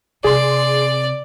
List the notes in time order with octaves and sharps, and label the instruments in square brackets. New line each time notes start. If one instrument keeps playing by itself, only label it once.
[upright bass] C3 [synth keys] G#4 C6 [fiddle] D5